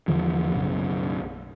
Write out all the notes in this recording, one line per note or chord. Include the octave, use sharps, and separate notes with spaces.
E2 D3 F3
B1 F#2 C#3